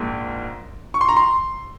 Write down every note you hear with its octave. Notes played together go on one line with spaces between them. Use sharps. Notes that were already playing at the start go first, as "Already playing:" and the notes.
Already playing: A#1 G#2 A#3
C#6
C6
A#5
C6